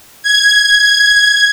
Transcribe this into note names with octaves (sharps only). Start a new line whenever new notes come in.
G#6